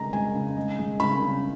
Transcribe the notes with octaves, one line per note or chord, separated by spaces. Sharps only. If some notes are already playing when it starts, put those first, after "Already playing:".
Already playing: C#3 G#3 A#5
G#3 G#5
C#3
G#3
G#3
C#3 B5
C#3